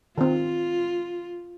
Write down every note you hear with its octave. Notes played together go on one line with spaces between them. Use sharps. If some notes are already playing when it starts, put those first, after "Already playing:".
D#3 C4 F4